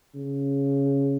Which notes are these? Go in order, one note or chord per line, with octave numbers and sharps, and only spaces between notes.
C#3